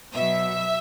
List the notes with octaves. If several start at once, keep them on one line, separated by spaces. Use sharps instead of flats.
B2 F#3 E5